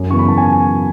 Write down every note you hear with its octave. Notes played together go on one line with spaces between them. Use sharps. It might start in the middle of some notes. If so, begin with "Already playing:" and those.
Already playing: F#2
C#3 E3 B3 C#6
B5
F#2 A5
G#5